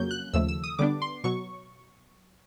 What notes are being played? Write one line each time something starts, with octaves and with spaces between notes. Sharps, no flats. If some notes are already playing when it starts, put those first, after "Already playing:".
Already playing: F2 C#3 F#3 A#3 C#4 G6
F#6
D#2 C#3 F3 A3 E6
E6
D#6
D3 G3 B3 D4 D6
C6
B2 F#3 C#6